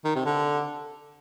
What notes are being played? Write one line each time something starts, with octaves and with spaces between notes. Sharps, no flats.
D#3
C3
D3